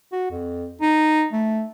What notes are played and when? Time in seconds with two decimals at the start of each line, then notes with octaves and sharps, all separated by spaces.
0.12 F#4
0.31 F2
0.81 D#4
1.33 A3